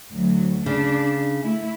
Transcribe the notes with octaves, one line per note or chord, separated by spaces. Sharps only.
D2 F#3
C#3 D4
A3 E4